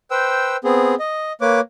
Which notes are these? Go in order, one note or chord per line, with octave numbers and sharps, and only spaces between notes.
B4 C5 G5 E6
B3 C4 G#4
D#5
A#3 B4 C#5 D6